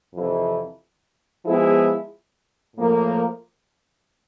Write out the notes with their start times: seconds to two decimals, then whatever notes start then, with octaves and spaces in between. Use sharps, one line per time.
0.14 F2 C3 E3
1.45 F3 G#3 B3 E4 G#4
2.76 A2 F3 A#3